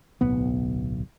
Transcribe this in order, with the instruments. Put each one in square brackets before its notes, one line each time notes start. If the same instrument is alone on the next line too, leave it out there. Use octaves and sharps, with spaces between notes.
[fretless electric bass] D1 B1 B3